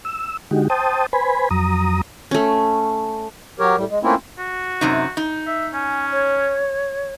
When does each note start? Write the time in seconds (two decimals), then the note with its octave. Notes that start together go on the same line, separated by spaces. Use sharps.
0.05 E6
0.51 D3 G#3 D#4 F#4 G4
0.70 C5 G5 A5 D#6
1.13 B4 C5 G#5 B5
1.51 F2 F#3 A#5 D#6
2.31 A3 C#4
3.59 F#3 G4 A#4 C#5
3.76 A2 G3
3.90 G#3
4.03 A3 A#3 C4 C#4 E4 F4
4.38 F#4
4.81 F#2 C3 D#4
5.17 D#4
5.47 E5
5.74 C#4 G#5
6.11 C#5